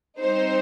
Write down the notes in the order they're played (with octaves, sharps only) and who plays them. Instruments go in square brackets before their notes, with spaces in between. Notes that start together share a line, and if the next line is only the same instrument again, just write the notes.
[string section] G3 C4 D#4 C5